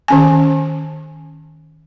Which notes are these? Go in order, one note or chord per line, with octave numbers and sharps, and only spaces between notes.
D#3 C#4 G#5